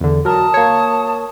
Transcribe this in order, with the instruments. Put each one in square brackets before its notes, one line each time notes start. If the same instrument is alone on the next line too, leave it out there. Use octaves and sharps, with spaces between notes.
[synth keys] E2 D3
[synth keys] F#3 A#4 [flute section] A5 D#6
[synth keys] A#3 C#5